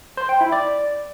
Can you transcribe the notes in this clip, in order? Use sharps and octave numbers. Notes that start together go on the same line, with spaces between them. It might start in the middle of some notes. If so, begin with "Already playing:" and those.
C5
G5
E4
D5